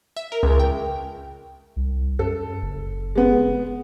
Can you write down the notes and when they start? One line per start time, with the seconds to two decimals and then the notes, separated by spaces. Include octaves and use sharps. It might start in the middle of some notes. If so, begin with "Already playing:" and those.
0.16 E5
0.32 A#4
0.43 C#2
0.60 G5
1.76 C2
2.19 F#2 A4
2.62 F#1
3.15 G#3 B3